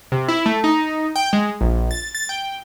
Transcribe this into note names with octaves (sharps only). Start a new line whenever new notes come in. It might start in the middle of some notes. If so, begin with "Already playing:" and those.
C3
E4
A3
D#4
G5
G#3
A#1
A6
A6
G5